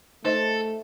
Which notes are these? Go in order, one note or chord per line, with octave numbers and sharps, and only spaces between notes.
A3 D#4 A4 C5 D#5